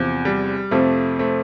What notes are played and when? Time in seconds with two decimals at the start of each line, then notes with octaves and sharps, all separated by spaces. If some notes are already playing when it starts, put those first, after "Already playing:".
Already playing: E2 C3 F3
0.25 G3
0.71 F2 C3 F3 A3
1.19 A3 C4